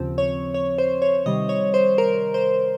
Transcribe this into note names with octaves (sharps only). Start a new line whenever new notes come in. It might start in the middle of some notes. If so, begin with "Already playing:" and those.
Already playing: D#2 C#3 F3 C4
C#5
C#5
C5
C#5
C3 D#3 G3 D#5
C#5
C5
A#4
C5